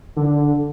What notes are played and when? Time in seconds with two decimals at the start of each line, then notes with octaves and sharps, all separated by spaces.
0.17 D3